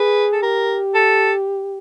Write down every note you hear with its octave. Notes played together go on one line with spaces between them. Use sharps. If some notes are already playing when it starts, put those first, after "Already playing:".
Already playing: G#4 B4
A4
G4 A#4
A4